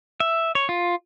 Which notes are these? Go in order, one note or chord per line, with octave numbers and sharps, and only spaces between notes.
E5
C#5
F4